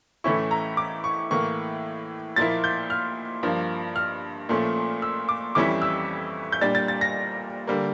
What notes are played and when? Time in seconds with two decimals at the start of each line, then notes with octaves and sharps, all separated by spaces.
0.24 A2 E3 A3 C#4 E4 C#6
0.51 A#5
0.77 D6
1.04 C#6
1.31 A2 E3 A#3 C#6
2.36 A#2 F3 A#3 E4 A6
2.64 G6
2.90 F6
3.43 G2 F3 A#3
3.96 F6
4.49 A#2 F3 A3 C#4
5.02 E6
5.29 D6
5.55 F2 E3 G3 C#4 E4 D6
5.82 E6
6.52 G6
6.61 A#2 G3 D4 A6
6.75 A6
6.88 A6
7.01 A#6
7.67 D3 G3 A#3